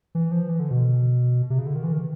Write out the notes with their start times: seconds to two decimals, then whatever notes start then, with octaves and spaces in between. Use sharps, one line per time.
0.15 E3
0.31 F3
0.49 E3
0.59 D3
0.71 B2
1.50 C3
1.58 C#3
1.66 D3
1.76 D#3
1.84 E3
1.92 D#3